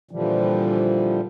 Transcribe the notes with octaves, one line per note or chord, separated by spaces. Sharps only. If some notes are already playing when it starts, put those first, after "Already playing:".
A#2 D3 E3 F3 G3